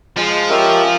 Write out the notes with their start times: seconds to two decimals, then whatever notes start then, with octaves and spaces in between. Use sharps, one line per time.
0.16 F3 G#3
0.50 C#4 G4 A#4 E5